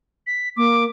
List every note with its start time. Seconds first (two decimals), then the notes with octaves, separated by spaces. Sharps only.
0.27 B6
0.57 A#3 D6